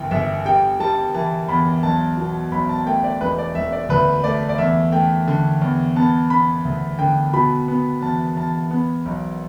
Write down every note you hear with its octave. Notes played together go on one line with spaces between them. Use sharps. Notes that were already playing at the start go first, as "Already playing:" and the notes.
Already playing: G1 E3 G5
G1 E5
G3 G5
G3 A5
E3 A5
E2 B5
B1 A5
B2
B1 B5
A5
A3 G5
D5
E1 B4
D5
E1 E5
D5
D2 B4
A3 D5
D5
E2 E5
A3 G5
D3
E2
B3 A5
B3 B5
D2
D3 G5
B2 B5
B3
E2 A5
E2 A5
B3
B1